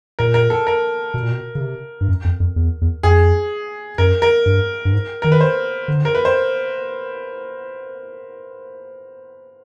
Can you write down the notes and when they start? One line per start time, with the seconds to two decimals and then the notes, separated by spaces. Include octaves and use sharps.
0.19 A#2 A#4
0.34 A#4
0.50 A4
0.67 A#4
1.14 B2
1.22 A#2
1.31 B2
1.55 C#3
1.61 C3
2.01 G2
2.08 F#2
2.24 F2
2.40 F2
2.56 E2
2.81 E2
3.03 F2 G#4
3.98 F#2 A#4
4.22 A#4
4.46 G2
4.85 G2
4.93 G#2
5.22 D#3 A#4
5.32 B4
5.41 C5
5.88 D3
6.05 A#4
6.15 B4
6.25 C5